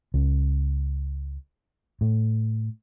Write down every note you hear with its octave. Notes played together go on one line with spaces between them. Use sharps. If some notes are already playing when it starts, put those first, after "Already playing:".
C#2
A2